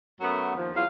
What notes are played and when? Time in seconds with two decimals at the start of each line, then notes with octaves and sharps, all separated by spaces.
0.21 F#2 F#3 A3 B3 B4
0.56 D#2 F3
0.74 E2 F#3 F4 F5